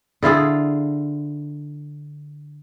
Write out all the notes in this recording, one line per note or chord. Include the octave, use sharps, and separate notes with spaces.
D3 E4 F4 G#4